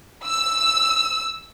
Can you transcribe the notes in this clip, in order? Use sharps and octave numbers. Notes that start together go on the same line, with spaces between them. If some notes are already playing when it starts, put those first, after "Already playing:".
E6